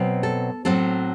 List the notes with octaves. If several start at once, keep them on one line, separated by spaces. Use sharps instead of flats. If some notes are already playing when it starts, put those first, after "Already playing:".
Already playing: B2 F#3 C4
A4
A2 F#3 C4 A4